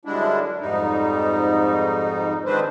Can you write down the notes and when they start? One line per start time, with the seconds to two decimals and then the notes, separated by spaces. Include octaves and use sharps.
0.05 F#2 D3 G3 G#3 D4 E4
0.61 F2 G#2 G3 D#4
2.45 D#3 G#3 C4 D4 B4 C5